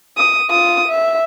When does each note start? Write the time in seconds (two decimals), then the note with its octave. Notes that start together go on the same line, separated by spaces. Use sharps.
0.17 D#6
0.49 F4 D#6
0.89 E5